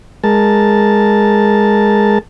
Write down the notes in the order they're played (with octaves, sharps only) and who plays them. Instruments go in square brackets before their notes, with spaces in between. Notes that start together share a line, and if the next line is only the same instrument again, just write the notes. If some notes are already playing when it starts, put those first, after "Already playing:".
[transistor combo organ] G#3 A#4 A5